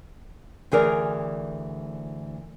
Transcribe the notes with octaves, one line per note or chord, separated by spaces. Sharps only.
D2 E3 G#4 A#4 D5